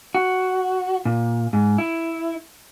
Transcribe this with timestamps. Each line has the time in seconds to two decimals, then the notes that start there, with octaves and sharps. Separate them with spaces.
0.15 F#4
1.05 A#2
1.53 G#2
1.78 E4